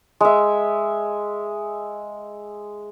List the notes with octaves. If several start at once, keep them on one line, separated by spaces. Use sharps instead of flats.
G#3 E5